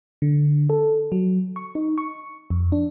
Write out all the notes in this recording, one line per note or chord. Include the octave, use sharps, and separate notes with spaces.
D3
A4
F#3
C#6
D#4
C#6
F2
D4